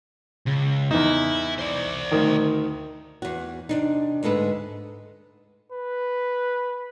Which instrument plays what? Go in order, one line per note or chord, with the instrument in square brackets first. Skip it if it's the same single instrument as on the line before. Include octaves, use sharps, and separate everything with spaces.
[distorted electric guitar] C#2
[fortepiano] E2 D#4 [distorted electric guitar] E4
[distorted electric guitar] C5 D5
[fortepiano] D2 D#3
[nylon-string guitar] E2 F#4
C3 D4 D#4
D2 G#2 G#3 A4 B4
[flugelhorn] B4